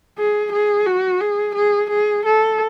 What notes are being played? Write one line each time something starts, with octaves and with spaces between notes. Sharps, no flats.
G#4
G#4
F#4
G#4
G#4
G#4
A4